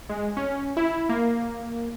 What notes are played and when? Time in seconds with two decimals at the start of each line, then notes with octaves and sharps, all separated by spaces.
0.09 G#3
0.37 C#4
0.77 E4
1.09 A#3